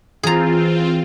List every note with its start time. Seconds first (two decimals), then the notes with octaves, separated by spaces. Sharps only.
0.23 E3 C4 F4 G#4 A#5